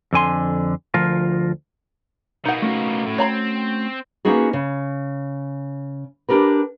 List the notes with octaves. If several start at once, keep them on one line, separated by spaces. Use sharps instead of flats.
F2 D3 G#5 C6
D2 F3 F4 A#4
B2 A#3 D#4 F#5
A3 C#4 F#4
A2
C4 C#5 A#5 B5
A#3 B3 C#4 D#4 F#4 G#4
C#3
D4 G4 A#4 B4